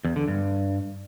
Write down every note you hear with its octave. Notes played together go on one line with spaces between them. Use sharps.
E2
D3
G2